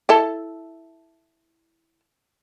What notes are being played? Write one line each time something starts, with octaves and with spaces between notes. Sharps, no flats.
E4 A4 A5